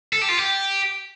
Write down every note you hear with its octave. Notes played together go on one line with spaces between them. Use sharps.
A4
G4
F4
G4